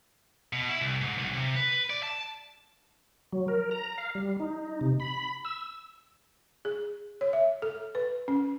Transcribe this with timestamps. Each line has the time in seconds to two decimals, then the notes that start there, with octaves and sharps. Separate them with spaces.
0.53 B2
0.69 E4
0.81 C2
1.01 G#2
1.18 B1
1.33 C3
1.56 B4
1.90 D5
2.03 A5
3.32 F#3
3.48 A#4
3.71 A#5
3.98 F5
4.15 G3
4.40 D#4
4.81 C3
5.00 B5
5.45 E6
6.65 G#4
7.21 C#5
7.33 E5
7.62 A4
7.95 B4
8.28 C#4